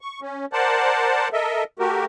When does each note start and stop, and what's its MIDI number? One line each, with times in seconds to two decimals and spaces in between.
0.01 0.20 85
0.22 0.45 61
0.53 1.28 70
0.53 1.28 72
0.53 1.28 74
0.53 1.28 78
0.53 1.28 81
1.33 1.64 69
1.33 1.64 70
1.33 1.64 75
1.33 1.64 76
1.79 2.05 57
1.79 2.05 66
1.79 2.05 67
1.79 2.05 70